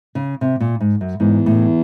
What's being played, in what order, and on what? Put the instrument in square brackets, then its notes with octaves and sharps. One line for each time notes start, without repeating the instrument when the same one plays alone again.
[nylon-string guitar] C#3
C3
A#2
G#2
F#2
[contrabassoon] E2 [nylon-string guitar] G#2
[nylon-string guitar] A2